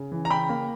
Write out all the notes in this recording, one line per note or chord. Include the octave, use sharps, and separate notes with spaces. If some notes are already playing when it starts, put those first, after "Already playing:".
Already playing: C#3
E3
A#5
C#3 G5 B5
A#3